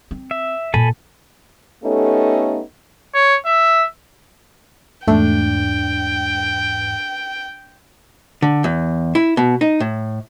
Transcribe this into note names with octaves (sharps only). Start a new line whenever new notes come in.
C4
E5
A#2 A4 G#5 B5
A3 B3 C#4 D#4 G4 A4
C#5
E5
E2 G#2 A3 D4 G5
D3
E2
E4
B2
D#4
A2